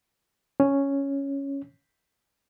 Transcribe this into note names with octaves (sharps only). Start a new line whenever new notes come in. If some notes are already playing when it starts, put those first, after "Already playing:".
C#4